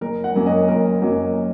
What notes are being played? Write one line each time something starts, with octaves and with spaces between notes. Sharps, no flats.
F#1 A#4
F#5
F#2 F#3 A#3 C#4
D#5
F#1 A#4
F#2 F#3 A#3 C#4